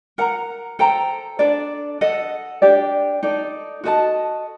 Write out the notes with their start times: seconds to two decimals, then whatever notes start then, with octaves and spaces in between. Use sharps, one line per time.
0.18 A#4 F#5 A#5
0.79 A4 C5 G5 A#5
1.39 D4 A4 D5
2.01 A4 D#5 F#5
2.62 D4 G4 D5
3.23 D#4 A4 D5
3.84 F#4 A4 D#5 A5